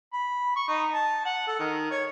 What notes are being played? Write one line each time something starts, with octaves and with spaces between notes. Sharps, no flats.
B5
C#6
D#4
A5
F#5
A4
D#3
C#5